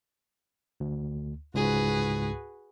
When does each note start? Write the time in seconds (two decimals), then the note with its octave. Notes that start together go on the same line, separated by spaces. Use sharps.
0.80 D2
1.54 C#2 G#2 F#4 G#4 B4